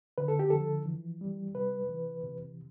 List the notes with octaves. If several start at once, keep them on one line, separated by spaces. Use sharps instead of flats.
D3 B4
A4
G4
F3 A4
E3
G3
C3 B4
E3
C3